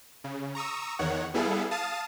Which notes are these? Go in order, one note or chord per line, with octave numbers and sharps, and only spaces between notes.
C#3
A#5 C#6 D#6 E6
E2 D#3 C#5 F#5
G3 B3 E4 G#4 A4 F5
F5 A5 D#6 A6